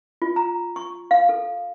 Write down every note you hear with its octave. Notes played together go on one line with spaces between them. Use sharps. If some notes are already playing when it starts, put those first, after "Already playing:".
F4
A#5
C#6
F5
A4